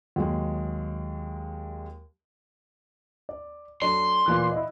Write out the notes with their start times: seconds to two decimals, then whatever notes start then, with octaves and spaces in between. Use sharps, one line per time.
0.16 D#2 F#3 G#3
3.29 D5
3.82 F#3 D4 A4 C6
4.26 A#2 E3 F#6
4.52 E4 D#5